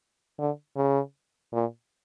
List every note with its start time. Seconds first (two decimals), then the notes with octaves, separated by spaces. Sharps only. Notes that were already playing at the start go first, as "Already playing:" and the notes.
0.39 D3
0.77 C#3
1.53 A#2